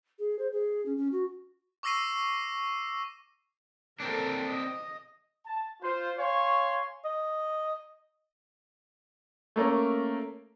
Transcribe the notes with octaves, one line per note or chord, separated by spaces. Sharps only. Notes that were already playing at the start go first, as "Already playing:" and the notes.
G#4
C5
G#4
C#4
C#4
F#4
C#6 D6 E6 A#6 C7 D#7
C4 D4 A4 A#4
D#5
A5
F4 C5
C#5 F5 G#5 C6 C#6
D#5
A3 A#3 C#4 A#4